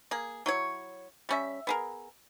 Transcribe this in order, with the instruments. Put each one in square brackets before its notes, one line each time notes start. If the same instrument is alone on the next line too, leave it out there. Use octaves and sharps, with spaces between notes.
[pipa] A#3 G#4
F#3 E4 C#5
G3 C#4 E5
B3 G#4 A#4